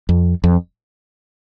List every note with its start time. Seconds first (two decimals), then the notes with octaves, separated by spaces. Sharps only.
0.09 F2
0.44 F2